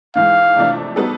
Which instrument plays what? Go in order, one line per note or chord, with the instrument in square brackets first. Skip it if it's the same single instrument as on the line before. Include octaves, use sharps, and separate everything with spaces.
[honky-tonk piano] G#2 E3 G#3 [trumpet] F5
[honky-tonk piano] F2 C3 E3 A3 D4
G3 B3 D#4 F#4 A4